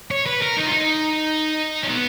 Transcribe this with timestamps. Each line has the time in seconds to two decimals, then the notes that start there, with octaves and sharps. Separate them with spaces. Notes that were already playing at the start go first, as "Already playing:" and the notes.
0.11 C#5
0.26 B4
0.41 A#4
0.57 D#4
0.65 F4
0.70 D#4
1.83 C#4
1.89 B3